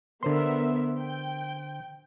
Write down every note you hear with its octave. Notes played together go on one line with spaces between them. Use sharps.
D3 B3 A#4 C5 E5 C6
G5